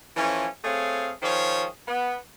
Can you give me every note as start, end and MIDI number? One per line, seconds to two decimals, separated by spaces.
0.17 0.47 52
0.17 0.47 53
0.17 0.47 57
0.17 0.47 61
0.64 1.12 57
0.64 1.12 60
0.64 1.12 68
0.64 1.12 73
0.64 1.12 77
1.22 1.67 51
1.22 1.67 53
1.22 1.67 68
1.22 1.67 72
1.22 1.67 73
1.88 2.16 59